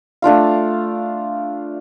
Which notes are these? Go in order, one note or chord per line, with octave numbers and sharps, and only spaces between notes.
A3 D4 F4 F5